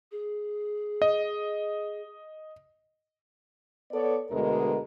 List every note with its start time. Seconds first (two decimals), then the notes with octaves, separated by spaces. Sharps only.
0.12 G#4
1.02 D#5
3.92 B3 A4 C#5 D5
4.29 D2 B2 D3 G#3 A#4